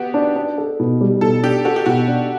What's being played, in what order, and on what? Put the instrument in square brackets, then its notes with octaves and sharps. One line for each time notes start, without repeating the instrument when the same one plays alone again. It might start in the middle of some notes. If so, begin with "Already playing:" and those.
Already playing: [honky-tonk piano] B3 F#4 G4
[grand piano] D4
D4
A4
B2
G3
[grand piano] B2 [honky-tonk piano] A4
[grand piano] D4 [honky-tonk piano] G4
[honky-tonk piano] F#4 [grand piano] A4
[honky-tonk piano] G4
[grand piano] B2 [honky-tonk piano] F#4
[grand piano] D4